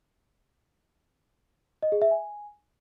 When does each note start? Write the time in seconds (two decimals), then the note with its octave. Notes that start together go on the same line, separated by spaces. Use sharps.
1.83 D#5
1.92 G#4
2.02 E5
2.11 G#5